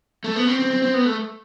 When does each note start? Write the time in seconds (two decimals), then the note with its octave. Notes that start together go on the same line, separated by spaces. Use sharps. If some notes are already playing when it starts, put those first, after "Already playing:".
0.24 A3
0.36 B3
0.48 C4
0.59 C4
0.71 C4
0.82 C4
0.94 B3
1.05 A3